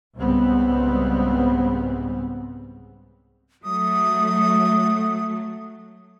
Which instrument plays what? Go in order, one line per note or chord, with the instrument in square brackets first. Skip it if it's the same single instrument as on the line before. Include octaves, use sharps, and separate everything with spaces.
[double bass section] C2 G#2 C#3 G3 B3 C4
[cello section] F#3 A3 [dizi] D#6